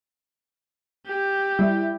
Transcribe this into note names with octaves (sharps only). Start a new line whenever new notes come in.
G4
G3 E4